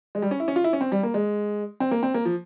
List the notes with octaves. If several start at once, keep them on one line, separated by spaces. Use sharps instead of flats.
G#3
G3
C#4
E4
C#4
F4
E4
C#4
C4
G3
A#3
G#3
C4
A#3
C4
A#3
F3